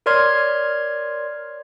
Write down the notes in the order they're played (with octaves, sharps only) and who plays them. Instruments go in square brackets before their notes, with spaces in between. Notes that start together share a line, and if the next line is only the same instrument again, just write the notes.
[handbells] A#4 C#5 D5 C6 F6 G#6